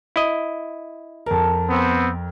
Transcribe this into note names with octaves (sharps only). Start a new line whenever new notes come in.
E4 D#5
F2 A#4 A5
B3 C4